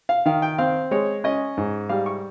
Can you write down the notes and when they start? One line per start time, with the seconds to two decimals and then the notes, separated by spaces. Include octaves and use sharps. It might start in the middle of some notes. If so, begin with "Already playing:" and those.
0.09 F5
0.26 D#3 F5
0.42 G5
0.58 C4 F5
0.91 G#3 C#5
1.24 C#4 D#5
1.57 G#2
1.89 G3 F5
2.06 C#6